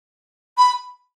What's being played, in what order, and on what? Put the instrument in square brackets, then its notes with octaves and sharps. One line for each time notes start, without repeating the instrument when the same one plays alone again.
[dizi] B5